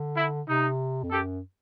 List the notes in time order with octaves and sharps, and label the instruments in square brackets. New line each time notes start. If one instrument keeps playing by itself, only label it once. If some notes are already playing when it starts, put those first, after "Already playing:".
Already playing: [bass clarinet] D3
[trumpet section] E4
[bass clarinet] C3 [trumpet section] D#4
[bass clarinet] F2
[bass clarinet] F#2 [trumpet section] G4 A4